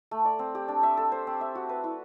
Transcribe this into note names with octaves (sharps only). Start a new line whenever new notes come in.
A3
D5
C4
G4
D4
E5
A4
C5
C4
E5
F#4
B4
E4